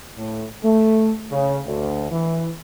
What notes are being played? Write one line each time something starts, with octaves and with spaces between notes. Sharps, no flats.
A2
A3
C#3
D2
E3